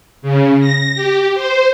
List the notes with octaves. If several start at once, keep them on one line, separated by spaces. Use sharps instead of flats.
C#3
A#6
G4
C5